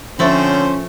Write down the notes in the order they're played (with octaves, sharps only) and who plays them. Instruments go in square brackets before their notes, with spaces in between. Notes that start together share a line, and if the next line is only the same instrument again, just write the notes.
[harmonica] D3 C4 C5 [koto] F3 A3 [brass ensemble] C#4